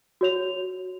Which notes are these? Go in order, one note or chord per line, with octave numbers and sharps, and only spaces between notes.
F#4 C#5 F7